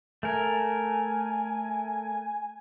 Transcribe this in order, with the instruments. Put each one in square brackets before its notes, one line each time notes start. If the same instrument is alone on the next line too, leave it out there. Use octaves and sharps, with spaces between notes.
[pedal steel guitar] A3 A#4 [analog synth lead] G#5